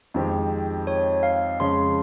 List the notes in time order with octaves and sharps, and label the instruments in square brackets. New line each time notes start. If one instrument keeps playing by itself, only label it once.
[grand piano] F2 D#3 G#3 C4 G4
[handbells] C#5
F5
[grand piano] F2 C#3 F3 G#3 C#4 [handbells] C6